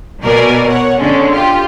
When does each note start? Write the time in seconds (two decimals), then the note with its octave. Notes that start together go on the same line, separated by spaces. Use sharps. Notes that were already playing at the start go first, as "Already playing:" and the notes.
0.24 B2 A#4 D5 G#5
0.67 C#5 F#5
0.98 D3 G#3 C#4 A4
1.32 F4 G4 F5